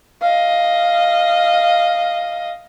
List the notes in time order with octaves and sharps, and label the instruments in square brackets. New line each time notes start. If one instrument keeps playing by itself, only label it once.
[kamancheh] D#5 F5